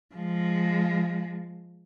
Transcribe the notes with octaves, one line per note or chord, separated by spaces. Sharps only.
F3 G#3